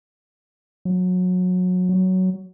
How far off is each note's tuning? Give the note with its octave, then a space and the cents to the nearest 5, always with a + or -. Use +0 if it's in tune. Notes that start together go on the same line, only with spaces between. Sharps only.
F#3 -25
F#3 +10